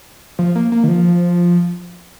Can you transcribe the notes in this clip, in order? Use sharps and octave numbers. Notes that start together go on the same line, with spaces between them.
F3
A#3
A#3
D#3
F3